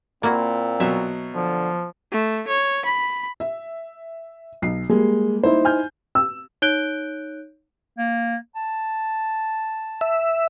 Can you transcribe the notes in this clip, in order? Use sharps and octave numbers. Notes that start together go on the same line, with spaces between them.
A#2 A#3 C4 E4 F#4
B2 F#3 E5
D3 F3
A3
C#5
B5
E5
B1 C7
G3 G#3 A#3
D#4 E4 C5
G#5 F6 G6
E6
D#4 C#5 F#6 G6 D7 G7
A#3
A5
E5